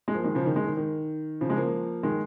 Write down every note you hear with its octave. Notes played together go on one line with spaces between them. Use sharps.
G#3
F3 A#3
D#3 G#3
C#3 F3
D#3
D#3 G#3
D#3
D#3
C#3 F3
G#3
F3 A#3
D#3 G#3